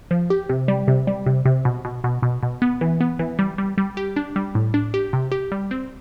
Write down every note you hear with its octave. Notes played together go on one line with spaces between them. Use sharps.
F3
G4
C3
G3
C3
G3
C3
C3
B2
B2
B2
B2
B2
B3
E3
B3
E3
G3
G3
G3
G4
D4
G3
A2
D4
G4
C3
G4
G3
C4